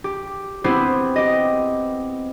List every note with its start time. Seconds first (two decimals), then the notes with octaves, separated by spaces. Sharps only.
0.04 G4
0.64 B3 C4 E4 G4 C5
1.16 G4 D#5